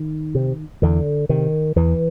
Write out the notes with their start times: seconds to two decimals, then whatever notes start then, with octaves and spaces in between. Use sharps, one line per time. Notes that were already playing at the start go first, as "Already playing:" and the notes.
Already playing: D#3
0.35 C3
0.82 E2 D3
1.29 C3 D#3
1.76 E2 E3